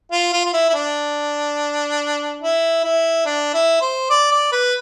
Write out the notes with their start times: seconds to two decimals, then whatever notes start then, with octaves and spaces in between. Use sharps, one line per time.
0.11 F4
0.33 F4
0.45 F4
0.53 E4
0.69 E4
0.74 D4
2.42 E4
2.84 E4
3.26 D4
3.54 E4
3.81 C5
4.10 D5
4.31 D5
4.52 B4